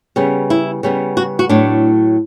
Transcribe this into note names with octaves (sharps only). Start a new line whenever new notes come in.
C#3 G3 B3
E4
C#3 G3 B3
F#4
F#4
A2 F#3 A3 D4